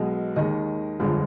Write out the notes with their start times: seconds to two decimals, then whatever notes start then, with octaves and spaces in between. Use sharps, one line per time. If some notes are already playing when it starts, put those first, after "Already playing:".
Already playing: B1 B2 G#3
0.36 D#2 D#3 G#3 D#5
1.00 G1 F2 D3 F3 G#3